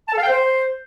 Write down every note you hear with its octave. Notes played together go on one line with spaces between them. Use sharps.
A5
A4
F5
G5
C5